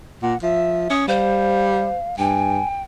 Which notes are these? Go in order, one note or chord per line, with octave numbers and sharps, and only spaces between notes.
A#2 F#5
F3 E5
C#4 D#6
G3 C5 F5
G2 G5 G#5